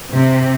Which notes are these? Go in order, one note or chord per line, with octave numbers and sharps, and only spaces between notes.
C3